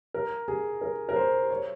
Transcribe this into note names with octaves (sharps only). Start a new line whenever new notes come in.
A#4
G#4
A#4
A#4
C5
C#5